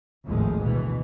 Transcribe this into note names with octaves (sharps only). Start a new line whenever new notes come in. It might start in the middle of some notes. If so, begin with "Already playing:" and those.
G#1 D#2 A2 F3 G#3
D2 B2 E3